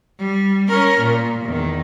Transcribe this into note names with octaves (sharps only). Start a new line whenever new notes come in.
G3
C#4 A#4
A#2
E2 D#3